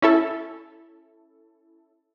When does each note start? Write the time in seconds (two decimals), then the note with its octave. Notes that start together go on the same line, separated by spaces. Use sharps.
0.02 C#4 E4 A4